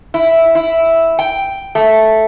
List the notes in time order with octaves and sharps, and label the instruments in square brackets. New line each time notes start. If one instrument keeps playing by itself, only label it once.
[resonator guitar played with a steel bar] E4
E4
G5
A3